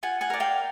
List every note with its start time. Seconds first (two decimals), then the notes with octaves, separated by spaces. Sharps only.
0.03 F4 F#5 G#5
0.21 F#5 G#5
0.30 A#4 D5
0.40 F5 G5